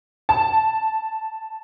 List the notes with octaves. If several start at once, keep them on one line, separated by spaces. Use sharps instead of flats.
A5